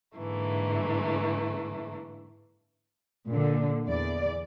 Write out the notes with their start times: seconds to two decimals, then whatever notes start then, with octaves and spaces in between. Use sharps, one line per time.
0.17 G#2 D3 E3 A3 A#3
3.28 A#2 D3
3.86 E2 D5